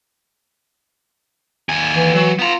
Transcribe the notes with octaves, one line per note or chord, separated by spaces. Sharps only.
D#2 G#5
E3
F#3
B3 F4 A#5